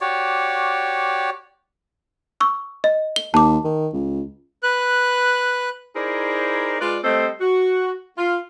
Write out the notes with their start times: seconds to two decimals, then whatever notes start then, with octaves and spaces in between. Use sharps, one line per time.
0.01 F#4 G4 C#5 D5
2.40 C#6 E6
2.84 D#5
3.16 G7
3.34 D#2 A5 D6
3.64 D#3
3.93 C#2
4.63 B4 F#6
5.96 D#4 E4 G#4 A#4 C5 D5
6.80 G#3 F4 B4 D5
7.04 G3 A3 C4 A4 C5 D#5
7.41 F#4
8.18 F4